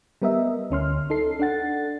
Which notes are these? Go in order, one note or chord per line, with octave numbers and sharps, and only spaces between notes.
G3 B3 A#4 D#5 E5
D2 C#4 C6 F6
D#4 A4 C7
D4 A4 F#5 A6